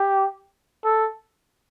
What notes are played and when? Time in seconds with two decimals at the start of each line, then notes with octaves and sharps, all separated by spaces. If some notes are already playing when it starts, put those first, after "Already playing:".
Already playing: G4
0.85 A4